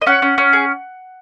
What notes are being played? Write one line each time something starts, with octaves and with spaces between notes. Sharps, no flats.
D#5
C#4 F#5
C#4
C#4
G#4